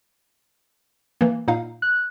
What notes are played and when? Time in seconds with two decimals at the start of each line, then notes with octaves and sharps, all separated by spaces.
1.21 E3 A#3
1.48 A#2 D#4 F5
1.82 F#6